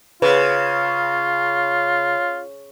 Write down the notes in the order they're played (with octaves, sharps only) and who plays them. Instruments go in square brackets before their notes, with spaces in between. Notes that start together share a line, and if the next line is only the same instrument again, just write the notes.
[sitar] C#3 [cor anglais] F4 [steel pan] B4